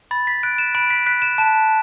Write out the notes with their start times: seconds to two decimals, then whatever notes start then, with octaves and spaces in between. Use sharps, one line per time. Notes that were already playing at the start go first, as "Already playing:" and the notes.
0.11 B5 A6
0.27 B6
0.43 F#6 D7
0.58 E7
0.75 B5 D7
0.90 B6
1.06 F#6 B6
1.22 E7
1.38 A5 E7